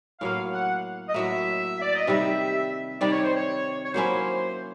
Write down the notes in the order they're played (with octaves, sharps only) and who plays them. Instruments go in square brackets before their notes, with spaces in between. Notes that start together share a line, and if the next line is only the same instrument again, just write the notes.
[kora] A2 F#3 A#3 [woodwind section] F5
[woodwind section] F#5
D#5
[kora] A2 F#3 A#3 [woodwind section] E5
[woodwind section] D5
D#5
[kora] C3 D#3 G3 [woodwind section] E5
[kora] C3 D#3 G3 [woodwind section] D5
[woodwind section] C#5
C5
C#5
C#5
[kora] F#3 A#3 C#4 E4 [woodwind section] C5